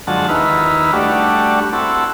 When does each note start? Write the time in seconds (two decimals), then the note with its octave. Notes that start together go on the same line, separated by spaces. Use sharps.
0.07 F#2 D3 F3 G#3 F#5 A5
0.29 D#2 D#4 E4 B4 F6
0.92 G3 A3 D4 F#4
1.73 C4 E4 F#4 A4